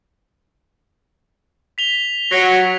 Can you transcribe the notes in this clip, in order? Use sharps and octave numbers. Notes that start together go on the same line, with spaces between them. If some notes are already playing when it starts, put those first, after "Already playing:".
B6 F7 G7
F#3 A#6 C7